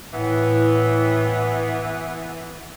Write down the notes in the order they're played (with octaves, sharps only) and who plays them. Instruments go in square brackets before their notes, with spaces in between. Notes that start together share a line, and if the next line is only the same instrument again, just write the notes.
[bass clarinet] A2 [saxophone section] E3 B3